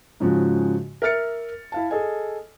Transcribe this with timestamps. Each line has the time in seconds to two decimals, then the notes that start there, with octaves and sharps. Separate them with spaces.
0.20 G#2 C#3 F3 G#3 F#4
1.02 A#4 E5 F6 A6 C#7
1.72 E4 F5 A5
1.90 G#4 A4 D#5 G#5